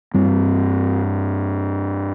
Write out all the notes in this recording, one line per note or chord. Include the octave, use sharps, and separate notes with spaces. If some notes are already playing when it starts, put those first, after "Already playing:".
G2 G3 C4